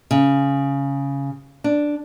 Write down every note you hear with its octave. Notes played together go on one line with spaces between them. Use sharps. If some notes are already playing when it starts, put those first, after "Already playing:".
C#3
D4